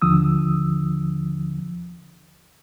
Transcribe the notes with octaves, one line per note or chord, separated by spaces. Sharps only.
D#2 D3 F3 D#6 E6